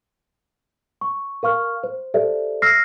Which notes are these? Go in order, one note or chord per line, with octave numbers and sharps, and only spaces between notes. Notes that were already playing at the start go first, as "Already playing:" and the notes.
C#6
A#4 F5 C#6 F6
C5
G4 A4 C5 D5 E5
E6 F6 A#6 C7